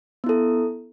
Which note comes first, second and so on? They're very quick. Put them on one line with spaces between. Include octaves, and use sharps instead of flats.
B3 E4 A4